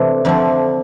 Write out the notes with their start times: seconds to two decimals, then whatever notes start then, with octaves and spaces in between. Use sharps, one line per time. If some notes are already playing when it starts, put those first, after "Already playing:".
Already playing: C3 E3 A3 D4 A4
0.25 F2 D3 F3 A3 D4